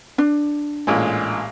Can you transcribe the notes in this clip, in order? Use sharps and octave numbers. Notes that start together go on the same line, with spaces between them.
D4
A1 A#2 G#3